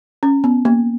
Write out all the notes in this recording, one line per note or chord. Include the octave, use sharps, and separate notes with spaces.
C#4
B3
A#3